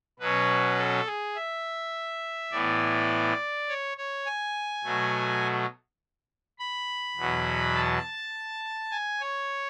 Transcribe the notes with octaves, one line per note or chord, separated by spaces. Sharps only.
B2 F#3 C#4 B4
A4
G#4
E5
A2 E3 B3 D5
C#5
C#5
G#5
B2 F#3 A3
B5
E2 B2 F#3
A5
G#5
C#5